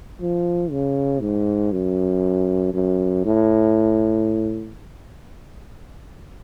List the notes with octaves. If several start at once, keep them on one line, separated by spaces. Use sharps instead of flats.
F3
C#3
G#2
F#2
F#2
A2